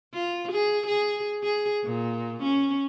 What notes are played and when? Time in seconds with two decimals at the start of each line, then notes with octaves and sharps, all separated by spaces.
0.14 F4
0.52 G#4
0.87 G#4
1.44 G#4
1.84 A#2
2.43 C#4